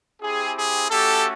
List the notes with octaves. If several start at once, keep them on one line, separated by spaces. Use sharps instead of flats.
C4 E4 G4 G#4
G#4
A3 C#4 F#4 G4 A4